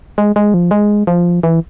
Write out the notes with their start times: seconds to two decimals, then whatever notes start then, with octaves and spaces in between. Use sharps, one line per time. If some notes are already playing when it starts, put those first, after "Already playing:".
0.18 G#3
0.36 G#3
0.54 F3
0.71 G#3
1.07 F3
1.43 E3